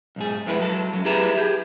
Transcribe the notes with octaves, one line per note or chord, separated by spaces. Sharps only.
B1 G#2 G#4
F2 G#3 E4 B4
F#3 A4
F#2 F#3
E4 G4 G#4 B4 E5 A#5
G4 G#4